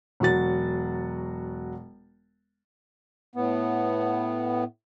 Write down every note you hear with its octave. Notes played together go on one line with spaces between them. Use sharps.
E1 F#3 F#4 A6
A2 B3